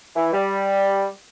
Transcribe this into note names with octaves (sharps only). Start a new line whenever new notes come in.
E3
G3